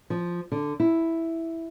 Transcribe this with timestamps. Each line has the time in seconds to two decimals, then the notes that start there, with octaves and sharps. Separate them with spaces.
0.10 F3
0.52 D3
0.80 E4